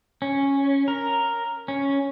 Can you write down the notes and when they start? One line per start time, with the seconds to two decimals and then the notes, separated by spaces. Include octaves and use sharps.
0.22 C#4
0.88 A#4
1.68 C#4